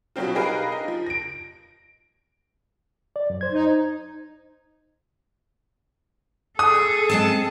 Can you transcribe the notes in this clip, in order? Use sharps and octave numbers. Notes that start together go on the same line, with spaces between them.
B2 F#3 G3 C4 F4
D#4 G4 G#4 A#4 B4 F5
D#4
F3
A#6 D7
D5
F#2
C5 G#6
D#4
G#4 A4 D#6
G#3 C4 A5